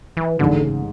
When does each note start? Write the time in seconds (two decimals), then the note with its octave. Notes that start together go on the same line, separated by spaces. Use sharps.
0.17 E3
0.39 A1 G#2 D3 G#3
0.62 C#3